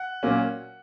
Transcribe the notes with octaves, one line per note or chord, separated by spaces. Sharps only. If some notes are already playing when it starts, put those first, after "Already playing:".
Already playing: F#5
A#2 F#3 A#3 C#4